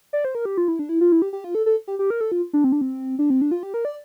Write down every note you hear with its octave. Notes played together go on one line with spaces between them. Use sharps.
D5
C5
A#4
G4
F4
E4
D4
E4
F4
E4
G4
G4
F4
A4
A4
G4
G4
A#4
A4
F4
D4
C4
D4
C4
D4
C4
D4
F4
G4
A#4
D5